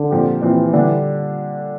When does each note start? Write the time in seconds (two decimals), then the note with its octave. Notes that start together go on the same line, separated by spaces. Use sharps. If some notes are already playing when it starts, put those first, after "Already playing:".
Already playing: D3
0.11 A#2 F3 C4 G4
0.42 A#2 E3 F3 C4 G4
0.73 D3 G3 D4